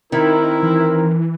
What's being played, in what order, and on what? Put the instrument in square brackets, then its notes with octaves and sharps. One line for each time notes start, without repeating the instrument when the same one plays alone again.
[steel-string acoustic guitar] D#3 [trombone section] C4 A#4 [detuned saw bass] D#4 [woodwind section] E4
[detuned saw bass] E3